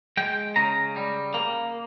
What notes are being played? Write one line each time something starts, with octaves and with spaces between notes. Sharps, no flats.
G#3 G5
C#3 A#5
G3
A#3